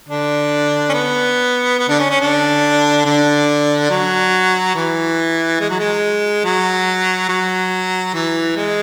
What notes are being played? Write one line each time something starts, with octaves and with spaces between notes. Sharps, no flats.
D3 D4
C#4
B3
B3
D3 D4
C#4
C#4
D3 D4
D3 D4
F#3
E3
G#3
F#3
G#3
F#3
F#3
E3
G#3